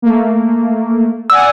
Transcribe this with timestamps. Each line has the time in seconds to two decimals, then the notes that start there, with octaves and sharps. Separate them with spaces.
0.02 A3 A#3
1.30 D5 F#5 G#5 E6